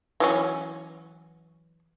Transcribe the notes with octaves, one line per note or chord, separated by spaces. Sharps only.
E3 F#3 C#4